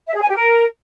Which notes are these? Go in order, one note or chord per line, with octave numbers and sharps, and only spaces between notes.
E5
G#4
G#5
G4
A#4